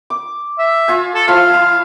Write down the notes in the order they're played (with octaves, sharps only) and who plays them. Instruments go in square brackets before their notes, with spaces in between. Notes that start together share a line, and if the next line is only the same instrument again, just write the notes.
[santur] D6
[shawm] E5
[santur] F4 G#5
[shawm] A4
[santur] F3 E4 C#6 [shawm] F5
[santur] E4 A5